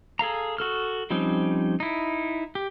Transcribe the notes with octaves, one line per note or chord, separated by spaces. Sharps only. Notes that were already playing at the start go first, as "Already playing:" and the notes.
G#4 A4 F5 A#5
F#4 A4 F6
F3 G3 C4 C#4 D#4
D#4 E4
G4